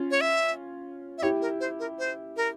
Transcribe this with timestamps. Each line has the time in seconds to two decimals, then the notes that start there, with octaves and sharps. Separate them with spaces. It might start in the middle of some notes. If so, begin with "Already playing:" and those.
Already playing: C#4 F4
0.11 C#5
0.21 E5
1.18 E5
1.22 E4 G4 C#5
1.41 A#4
1.60 C5
1.79 A#4
1.99 C5
2.37 A#4